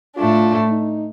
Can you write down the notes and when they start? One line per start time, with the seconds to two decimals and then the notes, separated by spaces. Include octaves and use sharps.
0.16 A2 A3 D4 F4
0.70 D#4